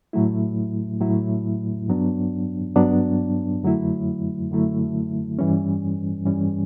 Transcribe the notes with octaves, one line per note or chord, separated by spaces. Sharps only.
A2 F#3 A3 E4
A2 F#3 A3 E4
G2 F#3 B3 D4
G2 F#3 B3 D4
F#2 D3 F#3 A3 E4
F#2 D3 F#3 A3 E4
G2 E3 G3 C#4
G2 E3 G3 C#4